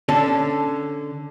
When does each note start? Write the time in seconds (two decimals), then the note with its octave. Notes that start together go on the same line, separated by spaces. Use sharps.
0.09 D3 C#4 A4